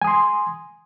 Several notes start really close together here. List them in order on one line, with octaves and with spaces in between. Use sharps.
G#5 D#6 C6